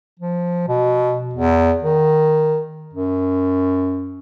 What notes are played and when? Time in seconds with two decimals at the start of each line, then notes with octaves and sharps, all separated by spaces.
0.19 F3
0.68 B2
1.33 E2
1.83 D#3
2.93 F#2